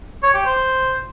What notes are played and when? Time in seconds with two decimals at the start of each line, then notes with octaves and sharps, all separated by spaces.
0.23 C#5
0.34 G4
0.45 C5